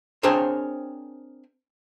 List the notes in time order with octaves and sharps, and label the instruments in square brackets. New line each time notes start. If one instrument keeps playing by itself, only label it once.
[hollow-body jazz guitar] C4 D4 G#4 A#4 C5 C#5